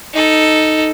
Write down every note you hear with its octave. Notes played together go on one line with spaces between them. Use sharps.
D#4 A4